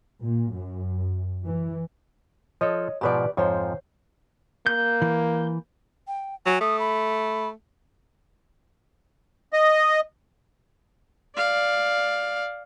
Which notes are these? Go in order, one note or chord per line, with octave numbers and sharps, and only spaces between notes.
A#2
F#2
E3
F3 A4 C#5 D#5
G#2 B2 F3 G4 B4 D5
F2 G#2 F3 C5 C#5
A#3 G6
E3
G5
F#3 G#5
A3 D#6
B5
D#5
D5 F5